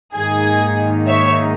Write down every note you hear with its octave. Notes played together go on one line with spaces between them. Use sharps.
G#2 D#3 A#3 D#4 G#4
C#5 E5